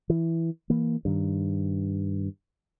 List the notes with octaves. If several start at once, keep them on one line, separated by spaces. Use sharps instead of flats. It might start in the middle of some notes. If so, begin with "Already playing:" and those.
E3
E3 A#3
G2 D#3